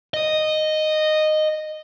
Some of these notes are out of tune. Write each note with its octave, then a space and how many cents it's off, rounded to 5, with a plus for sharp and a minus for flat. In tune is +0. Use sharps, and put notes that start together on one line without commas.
D#5 -10